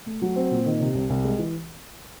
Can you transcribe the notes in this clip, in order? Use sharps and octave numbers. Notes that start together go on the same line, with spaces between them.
A3
F#3
C4
A#2
D#3
C3
C2
C2
G#3
E3